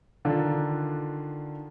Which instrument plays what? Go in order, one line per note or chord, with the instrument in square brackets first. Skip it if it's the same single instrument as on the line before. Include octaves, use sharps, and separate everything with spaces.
[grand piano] D3 D#3 D4 F4